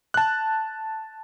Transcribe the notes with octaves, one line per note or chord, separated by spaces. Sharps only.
A5 F#6